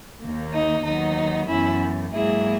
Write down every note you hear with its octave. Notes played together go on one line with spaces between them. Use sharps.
D#2 D#3 A#3
D#4
D#2 D#3 F#3 B3 D#4
F#2 E3 B3 C#4 E4
G#2 F#3 A#3 E4 G#4